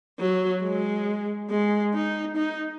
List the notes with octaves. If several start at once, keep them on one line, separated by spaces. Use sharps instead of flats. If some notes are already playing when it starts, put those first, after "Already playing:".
F#3
G#3
G#3
D#4
D#4